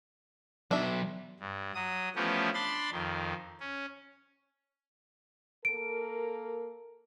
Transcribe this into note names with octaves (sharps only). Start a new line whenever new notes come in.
F#3 B3 D4 E5
G2
F#3 D#6
E3 F3 A3 B3 C#4 G4
D4 B5 C6 A6
F2 D#3
C#4
A#3 A4 A#4 D7